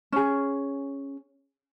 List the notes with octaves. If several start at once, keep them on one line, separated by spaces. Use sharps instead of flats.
C#4 G#4